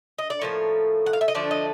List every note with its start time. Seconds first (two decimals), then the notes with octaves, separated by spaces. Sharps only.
0.18 D#5
0.30 D5
0.41 A2 F3 A#3 C#5
1.06 F#5
1.13 F5
1.21 E5
1.28 D#5
1.35 D3 F3 A3 D4 D5
1.51 D#5